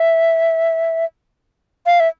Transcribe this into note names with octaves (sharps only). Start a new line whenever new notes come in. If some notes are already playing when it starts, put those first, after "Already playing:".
Already playing: E5
F5
E5